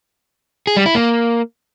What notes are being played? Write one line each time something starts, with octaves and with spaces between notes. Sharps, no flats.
G#4
G3
E4
A#3